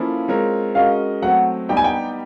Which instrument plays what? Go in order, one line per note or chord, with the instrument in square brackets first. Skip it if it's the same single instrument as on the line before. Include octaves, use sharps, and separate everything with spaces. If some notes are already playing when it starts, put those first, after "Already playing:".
Already playing: [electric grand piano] F3 A#3 C#4 E4 A4
G#3 C4 F4 A#4 C#5
[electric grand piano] G#3 C#4 F#4 A#4 D#5 [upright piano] F5
[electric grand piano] F#3 A3 C4 [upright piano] F#5
[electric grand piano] G3 B3 D#4 G4 [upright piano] G5
[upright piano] G#5
G5